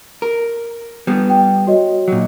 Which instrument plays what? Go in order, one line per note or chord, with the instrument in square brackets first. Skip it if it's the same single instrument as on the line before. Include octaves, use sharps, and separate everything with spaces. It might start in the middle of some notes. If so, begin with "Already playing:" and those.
[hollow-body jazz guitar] A#4
G3 B3
[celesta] G5
F#4 C#5 D#5
[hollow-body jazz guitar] A#2 F#3